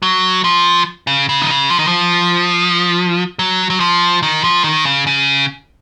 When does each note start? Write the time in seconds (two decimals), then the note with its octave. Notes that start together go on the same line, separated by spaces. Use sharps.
0.02 F#3
0.44 F3
1.07 C#3
1.29 C#3
1.42 D#3
1.50 C#3
1.70 F3
1.79 D#3
1.87 F3
3.39 F#3
3.70 F#3
3.80 F3
4.23 D#3
4.44 F3
4.64 D#3
4.85 C#3
5.07 C#3